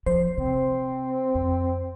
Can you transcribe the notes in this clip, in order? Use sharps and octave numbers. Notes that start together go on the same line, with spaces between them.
F3 C5
C3 C4
F2